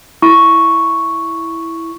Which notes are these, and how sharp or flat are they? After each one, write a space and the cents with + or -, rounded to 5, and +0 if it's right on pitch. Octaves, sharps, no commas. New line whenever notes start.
E4 +0 C#6 +0